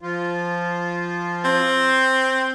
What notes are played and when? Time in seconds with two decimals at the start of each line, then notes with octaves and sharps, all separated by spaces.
0.01 F3 F4
1.45 C4